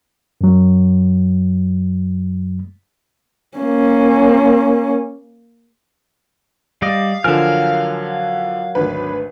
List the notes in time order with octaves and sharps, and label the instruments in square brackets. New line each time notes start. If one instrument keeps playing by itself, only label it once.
[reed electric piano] F#2 F#3
[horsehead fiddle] A#3 C#4
[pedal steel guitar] G3 D5 D#5 [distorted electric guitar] F5
[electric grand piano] D3 F3 [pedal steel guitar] F#3 A#4 F6 [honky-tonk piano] G#5 E7
[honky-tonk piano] G#1 D2 B4